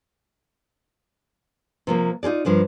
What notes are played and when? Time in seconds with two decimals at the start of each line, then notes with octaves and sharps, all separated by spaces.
1.87 C3 F3 A#3
2.23 D#4 F4 G#4 D5
2.45 G2 F3 D4 A#4